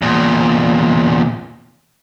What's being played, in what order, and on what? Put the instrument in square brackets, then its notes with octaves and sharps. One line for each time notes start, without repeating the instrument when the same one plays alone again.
[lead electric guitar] E2 A#2